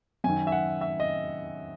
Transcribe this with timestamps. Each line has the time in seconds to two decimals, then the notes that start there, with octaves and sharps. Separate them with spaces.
0.24 F#2 D#3 G#5
0.47 E5
0.52 F#5
0.81 E5
1.00 D#5